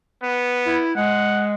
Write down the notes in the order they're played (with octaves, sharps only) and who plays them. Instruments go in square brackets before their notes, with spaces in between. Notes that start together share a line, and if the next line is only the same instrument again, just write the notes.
[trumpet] B3
[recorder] E4
[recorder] G#3 [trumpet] F#5